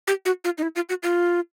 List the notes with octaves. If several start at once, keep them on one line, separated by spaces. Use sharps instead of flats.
G4
F#4
F4
D#4
E4
F4
F#4
F4